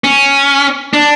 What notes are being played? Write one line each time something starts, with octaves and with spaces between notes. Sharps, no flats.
C#4
D4